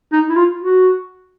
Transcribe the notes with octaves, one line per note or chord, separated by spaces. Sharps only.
D#4
E4
F4
F#4